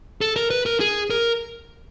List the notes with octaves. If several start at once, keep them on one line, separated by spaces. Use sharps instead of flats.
A4
A#4
B4
A#4
G#4
A#4